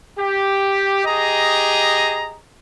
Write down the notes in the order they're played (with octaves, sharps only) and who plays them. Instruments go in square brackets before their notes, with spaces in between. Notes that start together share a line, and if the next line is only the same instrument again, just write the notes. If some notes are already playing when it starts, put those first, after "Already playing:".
[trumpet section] G4
G4 G#4 D#5 A#5